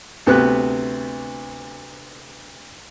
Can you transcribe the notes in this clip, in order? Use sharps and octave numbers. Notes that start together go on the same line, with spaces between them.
D2 C3 B3 F#6